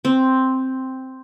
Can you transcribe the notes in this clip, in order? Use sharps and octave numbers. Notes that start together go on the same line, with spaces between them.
C4